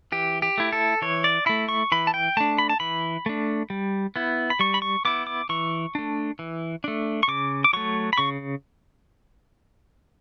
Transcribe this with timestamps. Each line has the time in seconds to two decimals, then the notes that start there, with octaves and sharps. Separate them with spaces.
0.12 E3 G4
0.42 G4
0.58 A3 E4
0.72 A4
1.02 E3 C#5
1.24 D5
1.46 A3 E4 B5
1.69 C#6
1.92 E3 B5
2.07 A5
2.14 G5
2.37 A3 D4 A5
2.58 B5
2.69 A5
2.80 E3 B5
3.26 A3 D4
3.70 G3
4.16 B3 E4
4.50 B5
4.60 G3 C#6
4.74 B5
4.82 C#6
5.05 B3 E4 D6
5.27 D6
5.49 E3 C#6
5.95 A3 D4
6.39 E3
6.84 A3 D4
7.23 C#6
7.28 C#3 D6
7.64 D6
7.73 F#3 A3 C#6
8.13 B5
8.18 C#3 C#6